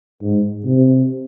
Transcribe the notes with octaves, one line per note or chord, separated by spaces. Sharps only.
G#2
C3